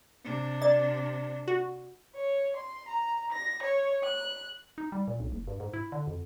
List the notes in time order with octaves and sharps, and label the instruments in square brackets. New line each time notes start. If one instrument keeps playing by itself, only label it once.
[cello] C3 D4
[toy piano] D5 [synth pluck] A6
[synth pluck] F#4
[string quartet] C#5
C6
A#5
A#6
C#5
F#6
[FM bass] D#4
G3
A#2
B1
F#1
G2
G#2
E4
D3
F2